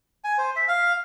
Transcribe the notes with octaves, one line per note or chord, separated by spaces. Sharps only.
G#5
C5
E5
F5